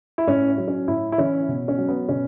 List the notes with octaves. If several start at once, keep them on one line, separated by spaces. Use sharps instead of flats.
E4
A2 C#4
F#3
C#4
A2 E4
E4
E3 C#4
B2
C#4
F#3
B3
B2 C#4